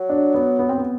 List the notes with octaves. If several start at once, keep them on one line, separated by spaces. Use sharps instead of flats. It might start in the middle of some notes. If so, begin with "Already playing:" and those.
Already playing: F#3
D4
B3
B3
C4
B3